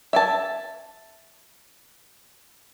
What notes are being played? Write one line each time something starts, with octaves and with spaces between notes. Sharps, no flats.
E5 G#5 A5